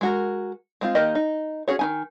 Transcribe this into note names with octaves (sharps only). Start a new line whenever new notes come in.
G#3 F#4 A#4
G#3 C4 F4
D#3 A#3 G4 A#4 D#5
D#4
C#4 F#4 G#4 C#5
D#3 D#4 G#5